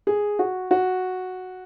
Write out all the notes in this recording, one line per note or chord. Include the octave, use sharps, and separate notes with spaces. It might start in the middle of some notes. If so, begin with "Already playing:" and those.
G#4
F#4
F#4